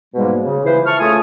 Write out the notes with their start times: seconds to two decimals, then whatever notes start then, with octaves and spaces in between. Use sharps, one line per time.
0.15 G#2 B2 G3 G#3 A#3
0.44 C#3
0.65 E3 F3 E4 B4 C5
0.86 E5 A5 C#6 F6
1.00 C#3 A3 F4 G#5 D#6